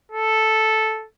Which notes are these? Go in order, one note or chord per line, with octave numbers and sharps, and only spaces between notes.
A4